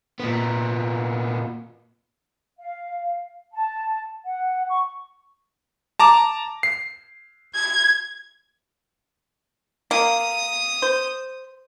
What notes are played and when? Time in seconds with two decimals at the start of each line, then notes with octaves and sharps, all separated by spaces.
0.20 A#2 B3
2.58 F5
3.54 A5
4.26 F#5
4.69 C#6
5.99 A5 A#5 D6
6.63 C7
7.55 G#6
9.91 A#3 D#6
10.82 C5